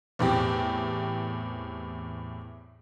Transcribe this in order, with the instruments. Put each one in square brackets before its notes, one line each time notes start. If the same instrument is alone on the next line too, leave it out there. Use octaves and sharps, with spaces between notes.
[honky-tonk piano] E2 A2 C4 G4